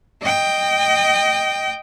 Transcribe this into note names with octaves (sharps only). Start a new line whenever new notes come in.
D#5 G5